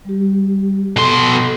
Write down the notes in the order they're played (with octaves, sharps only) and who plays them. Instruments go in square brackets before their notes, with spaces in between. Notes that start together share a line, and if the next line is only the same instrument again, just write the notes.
[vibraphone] G3 G4
[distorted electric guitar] B2 C6 [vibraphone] A4